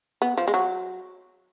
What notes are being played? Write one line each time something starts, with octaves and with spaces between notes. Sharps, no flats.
B3
F3
G#3
F#3